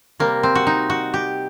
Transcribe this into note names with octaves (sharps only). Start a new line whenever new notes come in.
C3 G3 A#3
C4
F#4
D#4
F#4
G4